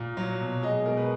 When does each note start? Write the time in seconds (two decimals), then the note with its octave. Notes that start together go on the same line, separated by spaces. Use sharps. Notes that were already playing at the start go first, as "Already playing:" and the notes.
Already playing: A#2
0.17 F#3
0.40 B2
0.62 G#3 D#5
0.86 B2 A#4
0.97 B4